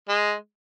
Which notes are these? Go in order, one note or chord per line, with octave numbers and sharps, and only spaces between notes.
G#3